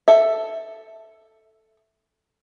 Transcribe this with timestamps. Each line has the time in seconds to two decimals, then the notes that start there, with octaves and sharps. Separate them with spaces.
0.08 A4 E5